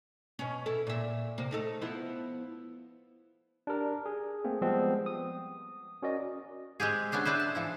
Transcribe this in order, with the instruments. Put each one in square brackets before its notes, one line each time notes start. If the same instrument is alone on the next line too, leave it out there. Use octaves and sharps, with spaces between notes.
[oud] B2 C#4
E4 A4
A#2 E5
C3 A#3
A3 D#4 A4
F3 B3 E4
[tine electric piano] D4 G4 A#4
G#4
A3 A#3 C4 G#4
F3 G3 G#3 B3 C4
D#6
C#4 F#4 A#4 D5 D#5
[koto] G#3 C4 G4 G#4
B3 C#4 D4 G#4
D4 E4 B4 C5
A5
E3 F3 E4